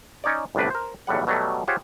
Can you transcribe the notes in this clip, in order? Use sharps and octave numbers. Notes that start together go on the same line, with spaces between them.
C#4 D#4 C#5 D5
G1 C2 A2 D4 B4
A#4 C5
B1 E2 A2 G3 F#5
B2 F#3 G3 A3
F4 G4 G#4 C5 C#5 F#5